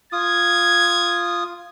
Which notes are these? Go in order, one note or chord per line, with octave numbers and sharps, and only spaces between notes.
F4 D#6 G#6